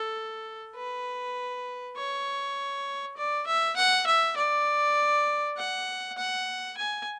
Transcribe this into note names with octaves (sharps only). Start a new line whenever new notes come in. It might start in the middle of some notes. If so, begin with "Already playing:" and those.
Already playing: A4
B4
C#5
D5
E5
F#5
E5
D5
F#5
F#5
G#5